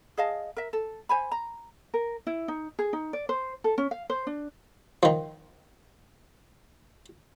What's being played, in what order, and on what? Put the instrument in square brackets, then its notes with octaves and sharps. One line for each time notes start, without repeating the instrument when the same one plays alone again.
[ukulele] G#4 D#5 F5 A5
A#4 E5
A4
C5 G#5 B5
A#5
A#4
E4
D#4
G#4
D#4
D5
C5
A4
C#4
F5
C5
D4
[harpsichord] D#3 F3